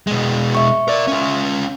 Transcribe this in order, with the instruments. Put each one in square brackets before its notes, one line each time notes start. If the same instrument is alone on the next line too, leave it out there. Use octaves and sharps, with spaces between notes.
[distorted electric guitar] B2 G#3
[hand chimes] E5 C#6
[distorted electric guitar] A#4 D5
C#4 F4